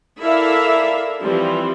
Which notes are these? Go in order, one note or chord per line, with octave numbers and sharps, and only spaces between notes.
E4 A4 A#4 D5 E5 F5
E3 F3 G3 C4 F4